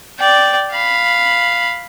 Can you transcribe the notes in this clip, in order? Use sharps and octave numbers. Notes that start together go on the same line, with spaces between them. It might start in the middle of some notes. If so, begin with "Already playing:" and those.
D5 G5
F5 B5